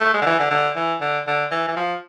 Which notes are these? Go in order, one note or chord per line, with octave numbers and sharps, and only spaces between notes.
A3
G#3
D3
E3
D3
D3
E3
D3
D3
E3
E3
F3